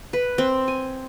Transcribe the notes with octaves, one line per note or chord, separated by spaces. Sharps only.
B4
C4
G#5